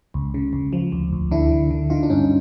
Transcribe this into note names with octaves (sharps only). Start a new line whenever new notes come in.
C#2
C#3
C#2
F3
D2
D2
D3 D4 E4
D3
D3
D3 D#4 F4
D4
G2 C#4 D#4